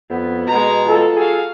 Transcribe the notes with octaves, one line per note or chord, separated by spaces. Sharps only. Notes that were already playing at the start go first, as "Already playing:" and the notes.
F2 B3
B2 G#3 A#5
F4 A4
F#4 G#4 F5